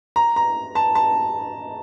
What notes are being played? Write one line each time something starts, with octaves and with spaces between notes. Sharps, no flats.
A#5
A#5
A5
A5